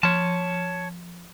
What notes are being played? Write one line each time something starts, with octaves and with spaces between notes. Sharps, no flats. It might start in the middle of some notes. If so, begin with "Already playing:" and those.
F3 C#5 A5